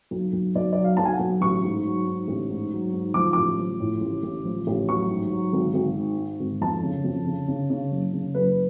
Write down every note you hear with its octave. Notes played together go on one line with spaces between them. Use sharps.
B1
B1
B1 D5
F#3 D5
F5
B1 A5
G#5
F#5
B1
A1 C#6
G#2
F#3
G#2
A1
G#2
F#3
G#2
F3 D6
A1 D6
F3
A2
A1
A1
F3
A1
F#3 C#6
G#2
F#3
G#1
G#1
G#2
G#2
G#1
F2 A5
C#3
F2
C#3
C#3
C#3
F#1
C#3
F#1 B4